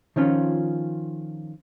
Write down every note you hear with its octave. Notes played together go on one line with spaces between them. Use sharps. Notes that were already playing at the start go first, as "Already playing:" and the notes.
D#3 F3 C#4 F4